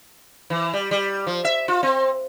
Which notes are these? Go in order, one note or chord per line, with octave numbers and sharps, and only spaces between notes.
E3
G3
G3
F3
E5
F4
C4